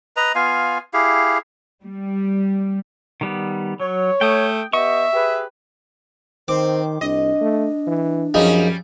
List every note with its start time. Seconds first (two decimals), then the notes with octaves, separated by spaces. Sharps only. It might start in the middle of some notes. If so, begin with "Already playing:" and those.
0.16 B4 D#5 A#5
0.35 B3 F4 F5 G#5
0.93 E4 G4 G#4 F5
1.84 G3
3.21 D#3 G3 B3
3.80 F#3 C#5
4.21 A3 G5 D#6
4.73 B3 G4 D#5 E5 C#6
5.13 G4 G#4 B4
6.48 D#3 C4 C5 D6
7.01 C2 D4 D#5
7.41 A3
7.87 E3
8.34 F#2 F3 G3 C#4 D#4 G#4